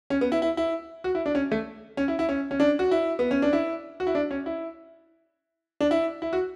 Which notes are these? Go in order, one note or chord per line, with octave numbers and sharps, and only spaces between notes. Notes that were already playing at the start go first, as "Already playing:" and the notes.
C#4
B3
E4
E4
E4
F#4
E4
D4
C#4
A3
C#4
E4
E4
C#4
C#4
D4
F#4
E4
B3
C#4
D4
E4
F#4
E4
D4
C#4
E4
D4
E4
E4
F#4